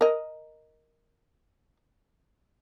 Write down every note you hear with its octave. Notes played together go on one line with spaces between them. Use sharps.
A#4 D#5